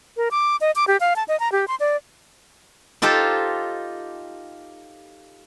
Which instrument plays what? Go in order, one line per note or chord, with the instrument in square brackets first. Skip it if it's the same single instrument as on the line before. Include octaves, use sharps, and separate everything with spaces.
[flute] A#4
D6
D#5
D6
G4
F5
A5
D#5
A#5
G4
C6
D5
[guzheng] D#4 F4 G4 A4 C5